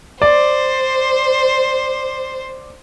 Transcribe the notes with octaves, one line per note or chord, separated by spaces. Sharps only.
C5 D5